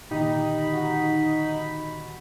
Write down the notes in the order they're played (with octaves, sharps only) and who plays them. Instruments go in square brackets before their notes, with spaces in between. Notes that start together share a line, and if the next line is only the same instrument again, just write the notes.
[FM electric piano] A#2 D3 D#3 [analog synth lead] D#4 [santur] G4 [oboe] B5
[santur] F#4